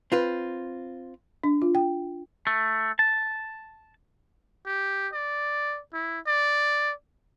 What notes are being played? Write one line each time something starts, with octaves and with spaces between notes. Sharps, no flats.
C4 F4 B4
D4
F4
G5
A3
A5
G4
D5
E4
D5